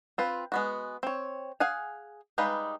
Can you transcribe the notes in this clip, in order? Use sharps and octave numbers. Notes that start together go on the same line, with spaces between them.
C4 F4 B4
G#3 B3 F#4
C4 C#5
G#4 F5 F#5 G#5
G3 G#3 D#4 B4 F5